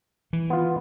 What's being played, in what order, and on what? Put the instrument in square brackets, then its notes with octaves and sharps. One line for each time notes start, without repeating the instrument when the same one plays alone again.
[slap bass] E3
[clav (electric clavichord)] B3 F4